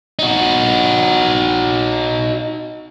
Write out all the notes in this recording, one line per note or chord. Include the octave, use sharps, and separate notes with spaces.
D#4 F#4